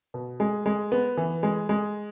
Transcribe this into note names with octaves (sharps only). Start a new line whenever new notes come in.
B2
G#3
G#3
B3
E3
G#3
G#3